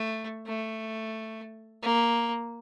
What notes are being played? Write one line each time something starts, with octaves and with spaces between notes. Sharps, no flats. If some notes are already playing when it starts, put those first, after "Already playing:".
Already playing: A3
A3
A#3